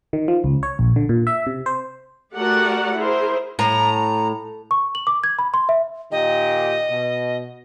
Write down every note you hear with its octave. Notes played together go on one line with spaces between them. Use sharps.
D#3
F3
C#2
C#5
A#1
D3
A#2
E5
C3
C5
A3 F#4 G4 A#4 D5 F#5
E4 G#4 A#4 C5
A2 A#5
C#6
F#7
D6
G#6
B5
C6
E5
A#2 D#3 G4 D#5
B2